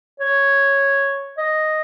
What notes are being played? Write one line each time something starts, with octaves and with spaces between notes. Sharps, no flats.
C#5
D#5